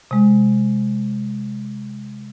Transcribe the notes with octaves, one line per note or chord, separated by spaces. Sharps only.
C3 G#3